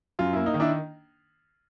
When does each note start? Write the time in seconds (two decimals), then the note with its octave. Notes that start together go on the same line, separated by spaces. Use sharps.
0.19 F#2 F4
0.33 A#3 E4
0.46 D#4
0.54 D#3
0.60 D4 E4